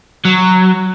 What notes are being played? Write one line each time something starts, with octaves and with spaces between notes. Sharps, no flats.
F#3